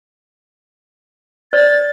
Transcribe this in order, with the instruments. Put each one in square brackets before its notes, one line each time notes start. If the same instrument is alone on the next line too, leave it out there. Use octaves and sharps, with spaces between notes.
[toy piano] C5 D5 [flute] A6